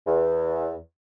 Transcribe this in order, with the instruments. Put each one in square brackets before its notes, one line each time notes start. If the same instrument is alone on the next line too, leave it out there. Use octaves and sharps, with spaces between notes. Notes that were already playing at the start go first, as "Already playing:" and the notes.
[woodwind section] E2